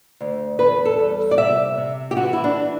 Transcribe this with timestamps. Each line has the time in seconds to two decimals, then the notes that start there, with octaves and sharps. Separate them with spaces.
0.21 D2
0.59 E2 B4
0.85 A4
0.99 G3
1.31 D5
1.38 C3 E5
1.78 C3
2.11 G4
2.17 E3 F#4
2.33 E4
2.44 D4